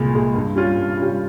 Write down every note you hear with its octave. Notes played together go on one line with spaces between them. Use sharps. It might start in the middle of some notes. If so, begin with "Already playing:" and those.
Already playing: C2 A#2 G#3
A#2 G#3
G2
G3 C#4 F4
G2
G3 C#4 F4